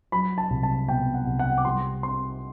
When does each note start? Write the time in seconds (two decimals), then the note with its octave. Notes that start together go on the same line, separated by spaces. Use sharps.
0.12 F#3 B5
0.38 A5
0.50 C2
0.63 A5
0.88 B2 G5
1.14 F#5
1.27 C2
1.39 F#5
1.58 D6
1.65 G3 C6
2.03 C4 C6